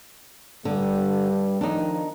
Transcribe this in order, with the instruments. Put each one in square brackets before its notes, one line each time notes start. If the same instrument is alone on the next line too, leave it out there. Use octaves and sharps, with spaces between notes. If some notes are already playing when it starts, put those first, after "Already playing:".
[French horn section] G2 G3 [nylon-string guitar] D3
[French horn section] D#3 F3 [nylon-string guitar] D4 D#4